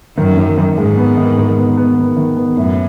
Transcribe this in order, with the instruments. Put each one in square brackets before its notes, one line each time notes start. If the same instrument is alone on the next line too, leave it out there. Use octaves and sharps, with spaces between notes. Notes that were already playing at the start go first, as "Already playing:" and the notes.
[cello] F#2 [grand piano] D#3
[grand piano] D#3
D#3
[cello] G#2 [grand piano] G#3
[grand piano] B3
D#3
D#3
B3
B3
D#3
D#3
B3
[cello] F#2 [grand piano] A2